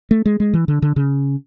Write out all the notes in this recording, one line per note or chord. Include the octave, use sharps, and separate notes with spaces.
A3
G#3
G#3
E3
D3
D3
C#3